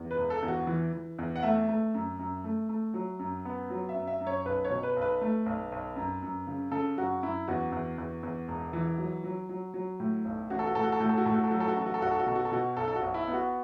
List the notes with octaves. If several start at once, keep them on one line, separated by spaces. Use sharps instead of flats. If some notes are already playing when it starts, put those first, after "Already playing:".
Already playing: E2
B4
E1
A4
E2
F#4
E3
E3
E2
F#5
A3 E5
A3
F#2
F#2
A3
A3
F#3
F#2
B3
F#3
E5
F#2
E5
F#2
C#5
B1 B4
C#5
B2
B4
B1
B4
A3
B1
B1
F#2
F#2
C#3
C#3 A4
F#2 F#4
F#2 E4
E2 F#4
E2
E2
E2
E1
E3
F#3
F#3
F#3
F#3
A2
B1
A1 F#4
A4
F#4
A2 A4
F#4
A4
A2 F#4
A4
F#4
A2 A4
F#4
A4
F#3 F#4
A4
F#4
A1 A4
F#4
A4
B1 F#4
A4
F#4
B2 A4
F#4
A4
B2 F#4
B1 A4
A4
F#4
B1
E4
B3
F#4